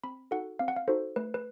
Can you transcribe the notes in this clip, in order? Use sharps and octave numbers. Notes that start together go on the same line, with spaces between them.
C4 B5
D#4 F#4 A4 F#5
C4 F5
F#5
F5
D#4 F#4 A4 C5
A3 B4
B4